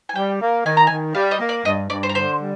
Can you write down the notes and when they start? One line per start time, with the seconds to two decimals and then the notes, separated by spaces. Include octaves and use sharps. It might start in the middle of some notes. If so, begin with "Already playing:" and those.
0.09 G#5
0.15 G3 G5
0.40 A#3
0.65 D#3 G#5
0.77 A#5
0.87 D#3 G#5
1.15 G3 F5
1.31 D#5
1.40 A#3
1.49 D5
1.65 G2 D#5
1.90 G2 D5
2.03 C5
2.09 A#4
2.15 D3 C5
2.40 G3